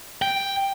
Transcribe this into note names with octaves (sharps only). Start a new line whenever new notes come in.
G5